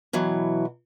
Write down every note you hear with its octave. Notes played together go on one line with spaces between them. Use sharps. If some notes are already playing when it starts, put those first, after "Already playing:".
B2 E3 F#3